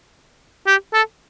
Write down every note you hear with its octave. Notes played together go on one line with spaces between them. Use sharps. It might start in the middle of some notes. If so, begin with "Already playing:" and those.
G4
A4